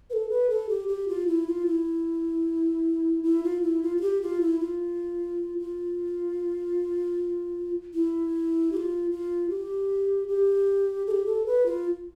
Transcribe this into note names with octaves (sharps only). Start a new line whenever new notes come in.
B4
A4
B4
A4
G4
G4
F4
E4
F4
E4
E4
F4
E4
F4
F4
G4
F4
E4
F4
F4
E4
G4
F4
F4
G4
G4
A4
G4
A4
B4
F4